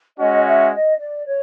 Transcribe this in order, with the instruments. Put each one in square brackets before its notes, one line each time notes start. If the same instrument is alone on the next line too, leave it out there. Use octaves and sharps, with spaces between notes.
[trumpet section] G#3 C#4 F#4 [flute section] D#5
[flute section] E5
D#5
D5
C#5